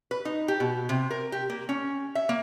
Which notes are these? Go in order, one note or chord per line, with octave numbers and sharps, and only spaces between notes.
B4
D#4
G4
B2
C3
A#4
G4
A#3
C#4
E5
A#3